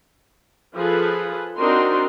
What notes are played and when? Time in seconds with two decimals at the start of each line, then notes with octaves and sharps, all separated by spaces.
0.75 F3 G#4 A4 B4
1.57 C4 D4 D#4 F#4 A#4 C6